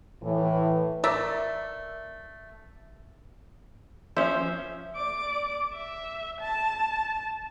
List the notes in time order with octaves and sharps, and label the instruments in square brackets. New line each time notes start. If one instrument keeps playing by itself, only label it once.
[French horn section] A2 E3
[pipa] A3 A#4 D5 E5
[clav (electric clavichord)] F3 C#4 [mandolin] C5 [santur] E5
[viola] D5 D6
E5
A5